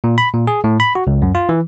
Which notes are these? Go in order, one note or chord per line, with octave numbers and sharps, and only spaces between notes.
A#2
B5
A#2
G#4
A2
B5
F#4
C#2
F#2
F4
E3